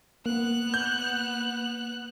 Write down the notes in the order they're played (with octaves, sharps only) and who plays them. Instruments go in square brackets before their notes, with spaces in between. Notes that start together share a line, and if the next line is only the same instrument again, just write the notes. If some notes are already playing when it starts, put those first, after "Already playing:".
[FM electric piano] A#3 [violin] B3 F#6
[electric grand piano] G6